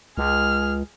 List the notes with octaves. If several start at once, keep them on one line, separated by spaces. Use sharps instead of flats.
C#2 G#4 F6